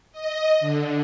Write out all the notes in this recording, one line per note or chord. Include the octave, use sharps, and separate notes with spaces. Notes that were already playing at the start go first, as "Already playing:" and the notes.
D#5
D3